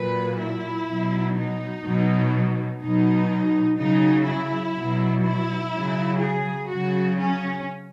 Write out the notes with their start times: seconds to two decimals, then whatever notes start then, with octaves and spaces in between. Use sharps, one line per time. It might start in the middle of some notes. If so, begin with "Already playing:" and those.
Already playing: A#2 F#3 B4
0.38 E4
0.87 B2 F#3
1.35 D#4
1.83 B2 F#3
2.81 B2 F#3 D#4
3.78 C#3 F#3 D#4
4.26 E4
4.74 B2 F#3
5.24 E4
5.72 C#3 F#3
6.21 G#4
6.69 C#3 F#3 F#4
7.18 C#4